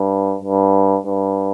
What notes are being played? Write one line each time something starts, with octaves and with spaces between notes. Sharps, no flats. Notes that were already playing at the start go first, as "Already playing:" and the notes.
Already playing: G2
G2
G2